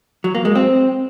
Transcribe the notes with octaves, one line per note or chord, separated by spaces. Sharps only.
F#3
A#3
G#3
C4